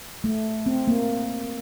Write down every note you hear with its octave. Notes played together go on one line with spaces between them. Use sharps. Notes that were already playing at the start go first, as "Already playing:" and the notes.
A3
C4
A#3